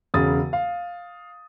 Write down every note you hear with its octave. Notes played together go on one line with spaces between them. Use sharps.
E1 C#3 D#6 A6
F5